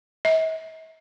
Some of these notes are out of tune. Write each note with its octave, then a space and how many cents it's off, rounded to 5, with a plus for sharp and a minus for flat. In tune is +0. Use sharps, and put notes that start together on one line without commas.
E5 -45